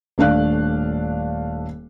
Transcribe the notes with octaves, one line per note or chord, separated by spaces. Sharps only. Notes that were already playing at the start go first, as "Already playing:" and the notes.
D#1 A3 D4 F5 F#6